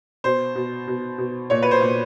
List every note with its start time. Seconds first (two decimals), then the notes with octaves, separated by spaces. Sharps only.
0.24 B2 C5
0.56 B2
0.88 B2
1.18 B2
1.50 A#2 C#5
1.62 B4
1.71 C5
1.81 A#2